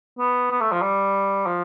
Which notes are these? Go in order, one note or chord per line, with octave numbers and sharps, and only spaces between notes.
B3
B3
A3
F3
G3
F3